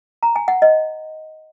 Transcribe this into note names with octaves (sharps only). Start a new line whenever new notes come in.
A#5
G#5
F#5
D#5